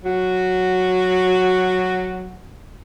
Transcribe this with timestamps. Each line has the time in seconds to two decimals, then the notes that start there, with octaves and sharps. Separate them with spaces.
0.04 F#3 F#4